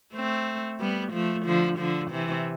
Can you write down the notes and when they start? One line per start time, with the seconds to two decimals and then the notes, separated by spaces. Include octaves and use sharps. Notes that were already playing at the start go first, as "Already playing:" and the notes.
0.14 A3 C4
0.80 G3 B3
1.12 F3 A3
1.45 D3 F3
1.78 D3 F3
2.11 C3 E3